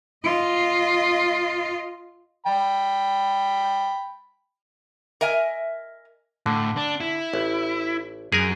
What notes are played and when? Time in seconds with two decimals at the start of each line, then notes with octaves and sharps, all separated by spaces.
0.24 F4 D#5
2.46 G5 B5
5.21 A#4 D#5 E5 G#5
6.46 A2 D3
6.77 D4
7.00 E4
7.34 A1
8.32 F#2 G#4 A#4 G#5